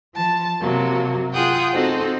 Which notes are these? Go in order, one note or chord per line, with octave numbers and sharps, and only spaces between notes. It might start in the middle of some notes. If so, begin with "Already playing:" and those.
F3 A5
C3 F#3 A#3
F4 G#4 F#5 G5 D#6
C4 D#4 F#4 A4 C5